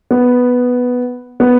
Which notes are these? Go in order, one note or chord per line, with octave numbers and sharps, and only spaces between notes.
B3
B3